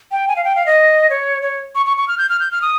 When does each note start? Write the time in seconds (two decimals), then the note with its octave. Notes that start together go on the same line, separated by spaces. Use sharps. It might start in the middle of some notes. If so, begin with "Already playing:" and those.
0.12 G5
0.28 G#5
0.36 F5
0.44 G5
0.56 F5
0.66 D#5
1.10 C#5
1.42 C#5
1.75 C#6
1.86 C#6
1.97 C#6
2.08 F6
2.18 G6
2.29 F6
2.40 G6
2.51 F6
2.62 D#6